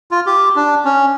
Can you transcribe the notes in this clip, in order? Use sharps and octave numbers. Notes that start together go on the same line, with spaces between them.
F4
G4
D4
C#4